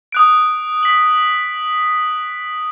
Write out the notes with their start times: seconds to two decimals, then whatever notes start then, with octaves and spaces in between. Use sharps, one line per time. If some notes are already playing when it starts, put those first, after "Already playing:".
0.12 D#6 F#6 D7
0.83 B6 F#7